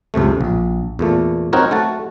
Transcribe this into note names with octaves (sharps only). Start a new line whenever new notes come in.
C#2 F#2 C3 A3
A#1
E2 A#2 A3
C4 D#4 F#4 A#4 C#5
A3 F#4 A5